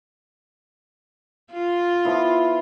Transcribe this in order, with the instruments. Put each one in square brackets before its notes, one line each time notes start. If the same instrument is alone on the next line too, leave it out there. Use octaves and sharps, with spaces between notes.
[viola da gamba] F4
[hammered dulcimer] F3 B3 E4